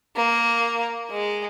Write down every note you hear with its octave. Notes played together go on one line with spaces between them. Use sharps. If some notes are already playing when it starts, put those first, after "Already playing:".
A#3
G#3